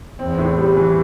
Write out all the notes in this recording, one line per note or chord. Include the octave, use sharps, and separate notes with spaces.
E2 C4
A2
G3
E3